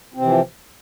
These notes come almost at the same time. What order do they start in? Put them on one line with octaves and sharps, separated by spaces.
C4 C3 E3 F3